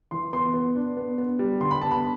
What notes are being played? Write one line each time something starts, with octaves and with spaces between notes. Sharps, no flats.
E3 C6
B3 C6
B3
D4
B3
B3
G3
D3 C6
B5
B3 A5
B5